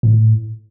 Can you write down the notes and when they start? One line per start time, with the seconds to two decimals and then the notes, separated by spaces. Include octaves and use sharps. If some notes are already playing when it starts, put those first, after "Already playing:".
0.03 A2